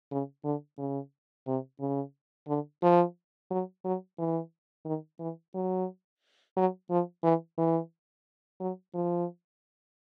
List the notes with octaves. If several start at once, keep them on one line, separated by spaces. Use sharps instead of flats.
C#3
D3
C#3
C3
C#3
D3
F3
F#3
F#3
E3
D#3
E3
F#3
F#3
F3
E3
E3
F#3
F3